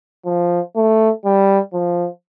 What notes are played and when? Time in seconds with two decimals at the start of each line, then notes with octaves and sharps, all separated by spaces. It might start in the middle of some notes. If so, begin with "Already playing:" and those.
0.26 F3
0.76 A3
1.25 G3
1.73 F3